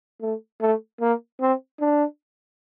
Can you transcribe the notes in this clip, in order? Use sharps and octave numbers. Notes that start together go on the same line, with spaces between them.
A3
A3
A#3
C4
D4